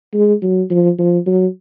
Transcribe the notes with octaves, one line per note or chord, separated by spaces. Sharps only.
G#3
F#3
F3
F3
F#3